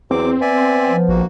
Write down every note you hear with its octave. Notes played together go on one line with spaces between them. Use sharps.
E2 F#3 C4 D6
B3 D5 E5 G#5
F3
A#1 A#3 F#4